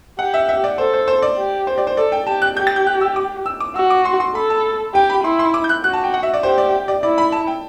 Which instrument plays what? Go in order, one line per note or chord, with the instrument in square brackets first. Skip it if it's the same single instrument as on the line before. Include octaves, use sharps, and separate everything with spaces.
[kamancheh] G4 [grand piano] F#5
[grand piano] E5
E5
D5
[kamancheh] A4 [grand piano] C5
[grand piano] C5
C5
D5
[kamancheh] G4
[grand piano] C5
D5
C5
[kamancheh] A4 [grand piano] D5
[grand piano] G5
[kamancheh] G4 [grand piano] A5
[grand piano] F#6
[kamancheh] G4 [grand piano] G6
[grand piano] A6
G6
F#6
E6
D6
E6
D6
[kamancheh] F#4 [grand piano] E6
[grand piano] D6
C6
C6
[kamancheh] A4 [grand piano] B5
[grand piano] A5
[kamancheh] G4 [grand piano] G5
[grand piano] B5
[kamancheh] E4 [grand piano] C6
[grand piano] C6
D6
G6
F#6
[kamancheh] F#4 [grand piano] F#6
[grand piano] A5
G5
F#5
E5
D5
[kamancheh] G4 [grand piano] C5
[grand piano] D5
D5
[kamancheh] E4 [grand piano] D5
[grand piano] B5
A5
G5